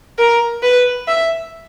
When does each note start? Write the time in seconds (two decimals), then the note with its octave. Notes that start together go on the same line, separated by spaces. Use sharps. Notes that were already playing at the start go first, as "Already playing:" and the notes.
0.18 A#4
0.63 B4
1.08 E5